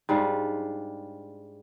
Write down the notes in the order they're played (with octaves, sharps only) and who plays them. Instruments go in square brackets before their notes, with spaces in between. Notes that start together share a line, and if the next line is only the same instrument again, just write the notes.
[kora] G#2 G3 D4 F4